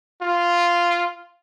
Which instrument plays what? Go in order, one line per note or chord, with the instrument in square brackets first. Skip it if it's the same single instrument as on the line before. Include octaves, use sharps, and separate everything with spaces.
[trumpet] F4